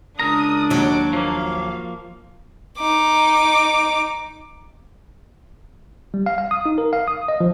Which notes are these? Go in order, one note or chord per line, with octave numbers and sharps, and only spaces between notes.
C#2 D4 A#4 A#5 D#6
D#2 F#3 D6
F3 A#3 F5
D#4 D6
G3
F5
F5
D#6
D#4
A#4
F5
D#6
D#5
F3